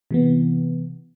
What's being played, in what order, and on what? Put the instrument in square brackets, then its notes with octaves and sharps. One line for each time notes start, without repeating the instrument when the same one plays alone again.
[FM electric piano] C3 E3 B3